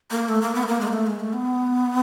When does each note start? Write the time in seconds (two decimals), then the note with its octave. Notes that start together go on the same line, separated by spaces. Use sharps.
0.11 A#3
0.29 A3
0.42 A#3
0.55 B3
0.63 A3
0.68 A#3
0.81 G#3
0.88 A#3
0.93 A3
1.07 G#3
1.20 A3
1.33 B3